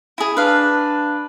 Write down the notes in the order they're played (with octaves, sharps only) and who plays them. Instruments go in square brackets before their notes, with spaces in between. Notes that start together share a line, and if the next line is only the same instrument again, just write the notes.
[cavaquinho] E4 G#4
[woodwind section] D4 [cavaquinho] B4 F5